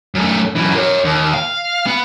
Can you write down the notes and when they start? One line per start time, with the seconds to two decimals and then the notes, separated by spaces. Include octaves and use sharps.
0.15 F#2 A3
0.56 F#2 E3
0.75 A#4 C#5
1.05 D#2
1.34 F5
1.87 B3